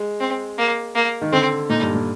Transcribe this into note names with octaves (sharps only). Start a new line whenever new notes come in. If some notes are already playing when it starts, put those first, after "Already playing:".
Already playing: G#3
C4
A#3
A#3
D#3
D3 C4
A#2 D#4
G2
A#2